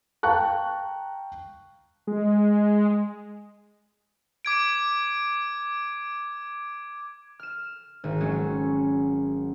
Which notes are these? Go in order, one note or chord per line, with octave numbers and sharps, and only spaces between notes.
F5 G5 A5 A#5 C#6 F#6
G#3
D6 G#6 D7
F6 E7
G#1
F#3 G#3 C#4